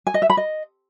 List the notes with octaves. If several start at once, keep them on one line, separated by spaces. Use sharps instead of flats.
G#5
D#5
E5
B5
D#5